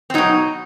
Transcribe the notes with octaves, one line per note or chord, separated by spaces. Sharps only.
C4
B2 F#3 D#4